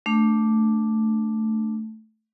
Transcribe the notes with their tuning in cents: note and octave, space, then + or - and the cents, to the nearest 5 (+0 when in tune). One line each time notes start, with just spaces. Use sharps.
A3 +0 D4 +0